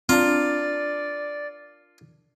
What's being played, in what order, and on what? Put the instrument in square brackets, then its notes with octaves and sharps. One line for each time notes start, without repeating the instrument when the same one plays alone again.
[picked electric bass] C4 [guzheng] D4 A#4 [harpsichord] F4 [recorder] D5